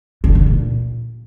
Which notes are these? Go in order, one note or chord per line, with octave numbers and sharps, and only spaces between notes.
D3
A#2
A#2